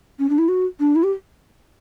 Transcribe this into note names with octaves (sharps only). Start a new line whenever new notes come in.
C#4
D4
E4
F#4
D4
E4
G4